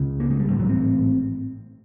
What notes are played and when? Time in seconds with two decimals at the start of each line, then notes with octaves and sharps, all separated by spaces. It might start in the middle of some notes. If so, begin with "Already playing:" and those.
Already playing: C#2 C#3
0.20 A#3
0.30 G#3
0.40 G3
0.50 A1 G#2 G3
0.60 F#3
0.69 C4